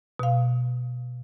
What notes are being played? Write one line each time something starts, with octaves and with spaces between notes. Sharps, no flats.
B2 F5